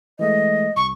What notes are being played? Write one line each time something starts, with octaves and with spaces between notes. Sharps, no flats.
E3 G#3 A3 D#5
C2 C#6